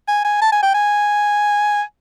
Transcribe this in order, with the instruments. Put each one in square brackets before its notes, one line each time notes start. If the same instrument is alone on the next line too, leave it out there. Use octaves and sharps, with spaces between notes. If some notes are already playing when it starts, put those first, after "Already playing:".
[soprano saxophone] G#5
G#5
A5
G#5
G5
G#5